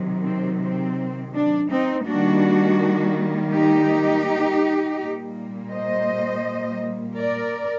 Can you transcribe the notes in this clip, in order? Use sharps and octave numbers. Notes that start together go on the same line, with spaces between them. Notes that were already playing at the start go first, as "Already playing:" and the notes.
Already playing: C3 D#3 F#3
C4
C4
D4
C4 D#4
D#3 G3 A#3 D4 F#4
D#4 G4
A#2 G3 A#3
C5 D#5
A#4 D5